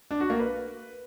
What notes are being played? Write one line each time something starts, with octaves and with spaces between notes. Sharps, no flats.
D4
F#4
A#3
B4